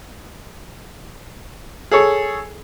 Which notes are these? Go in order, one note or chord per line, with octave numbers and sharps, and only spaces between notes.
G#4 A4 C#5